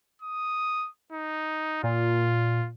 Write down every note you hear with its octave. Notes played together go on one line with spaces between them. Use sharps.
D#6
D#4
A#2 F4